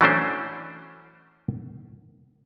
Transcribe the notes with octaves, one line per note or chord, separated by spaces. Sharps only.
E3 F#3 A3 C#4 D4 C5